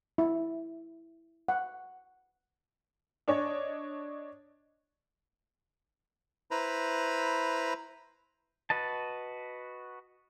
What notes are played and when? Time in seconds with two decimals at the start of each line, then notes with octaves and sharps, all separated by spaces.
0.18 E4
1.48 F#5
3.28 D4 C#5 D#5
6.51 E4 B4 C5 A#5 B5
8.70 F#4 B4 D#5 A5